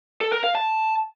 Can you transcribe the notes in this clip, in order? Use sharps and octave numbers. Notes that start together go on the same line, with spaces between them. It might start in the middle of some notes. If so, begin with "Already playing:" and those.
A4
A#4
F5
A5